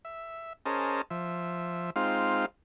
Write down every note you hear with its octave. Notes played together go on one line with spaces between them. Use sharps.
E5
C#4 G#4 A#4 C5 D#5 A5
F3 E5
G#3 C4 D#4 F4 F5